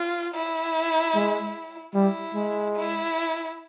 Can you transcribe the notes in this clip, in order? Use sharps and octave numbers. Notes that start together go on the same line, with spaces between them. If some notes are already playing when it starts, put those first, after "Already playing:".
Already playing: F4
E4
G#3
G3 E4
G#3
E4